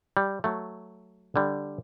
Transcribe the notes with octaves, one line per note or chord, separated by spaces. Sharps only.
G3
F#3 A3
D3 G3